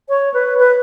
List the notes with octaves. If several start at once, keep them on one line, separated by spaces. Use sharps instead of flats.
C#5
B4
B4